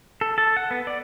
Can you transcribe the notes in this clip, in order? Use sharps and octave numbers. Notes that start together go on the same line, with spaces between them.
A4
A4
F#5
B3
D5